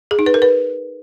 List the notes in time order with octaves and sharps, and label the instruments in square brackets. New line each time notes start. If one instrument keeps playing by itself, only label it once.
[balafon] G#4
D#4
B4
A#4
B4